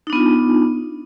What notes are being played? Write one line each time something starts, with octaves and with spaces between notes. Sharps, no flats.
B3 D4 D#4 F4